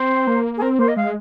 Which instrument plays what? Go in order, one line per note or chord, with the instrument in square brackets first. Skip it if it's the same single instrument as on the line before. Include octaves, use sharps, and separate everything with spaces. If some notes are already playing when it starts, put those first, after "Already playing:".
Already playing: [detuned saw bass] C4 [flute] C5
[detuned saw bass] A#3
[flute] G#4
[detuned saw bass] C4 [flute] A#4
[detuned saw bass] A#3 [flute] C5
[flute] D#5
[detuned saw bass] G#3 [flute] F5